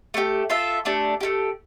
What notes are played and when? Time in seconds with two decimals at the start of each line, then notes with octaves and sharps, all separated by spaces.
0.14 A3 D4 G4
0.50 F4 A4 E5
0.85 A3 D4 G4 D5
1.21 A3 E4 G4